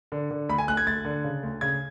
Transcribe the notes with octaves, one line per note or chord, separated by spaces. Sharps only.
D3
D3
D2 B5
G#5
D2 F#6
G#6
D2 A6
D3
C#3
D2
C#3 G#6